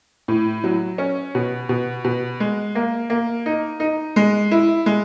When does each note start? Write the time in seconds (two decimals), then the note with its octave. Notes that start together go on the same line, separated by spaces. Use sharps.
0.28 A2
0.64 F#3
0.98 C#4
1.35 B2
1.69 B2
2.04 B2
2.40 G#3
2.75 A#3
3.10 A#3
3.46 D#4
3.80 D#4
4.16 G#3
4.51 E4
4.86 G#3